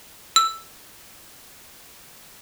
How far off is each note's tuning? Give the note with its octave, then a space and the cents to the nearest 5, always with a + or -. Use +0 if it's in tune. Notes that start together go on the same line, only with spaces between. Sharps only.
E6 +5